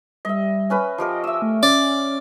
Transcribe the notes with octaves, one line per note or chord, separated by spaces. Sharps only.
G3 D#5 E5
C#4 B4 B5
F3 G4 A#4 D#5
D#5 E5 E6
A3
C#4 D5